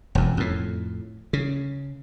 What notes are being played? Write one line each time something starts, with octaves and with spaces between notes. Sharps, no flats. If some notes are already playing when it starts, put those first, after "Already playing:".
E1 F2
F2 A2
C#3